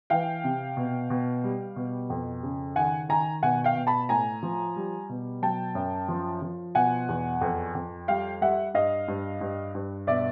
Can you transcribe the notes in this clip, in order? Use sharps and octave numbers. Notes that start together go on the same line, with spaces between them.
E3 F5 G5
C3
B2
B2
G3
B2
F2
C#3
D#3 F#5 G#5
D#3 G#5 A#5
B2 F#5 G#5
F5 G5
B2
A5 B5
A2 G#5 A#5
F3
G3
B2
F#3 G5 A5
F#2
F3
F3
B2 F#5 G#5
E2
F2
F2
G3 F5 G5
G3 E5 F#5
G2 D#5 F5
G2
G2
G2
B2 D5 E5